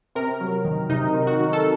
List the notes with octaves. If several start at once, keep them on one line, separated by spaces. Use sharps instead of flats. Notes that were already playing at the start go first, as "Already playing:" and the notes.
C3 A#4
F#3
D#3
C3 D#4
D#3
F#4
D#3
A4